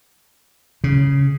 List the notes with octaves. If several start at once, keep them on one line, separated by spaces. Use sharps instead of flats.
C#3